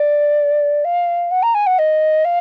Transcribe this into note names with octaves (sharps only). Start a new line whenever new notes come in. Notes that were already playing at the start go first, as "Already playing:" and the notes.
Already playing: D5
F5
F#5
A#5
G#5
F#5
D#5
F5